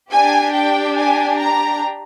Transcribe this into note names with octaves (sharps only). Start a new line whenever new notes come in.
D4 G4 G#5
G5
G#5
A#5